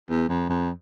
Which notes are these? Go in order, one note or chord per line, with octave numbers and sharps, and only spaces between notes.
E2
F2
F2